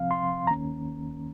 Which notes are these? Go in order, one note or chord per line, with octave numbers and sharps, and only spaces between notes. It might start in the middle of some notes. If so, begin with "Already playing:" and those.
Already playing: C3 F3 C4 F5
C6
D#2 D#3 A#3 C#4 A#5